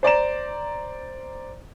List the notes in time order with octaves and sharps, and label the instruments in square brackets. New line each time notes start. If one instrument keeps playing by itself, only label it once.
[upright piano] C5 D5 A#5 E7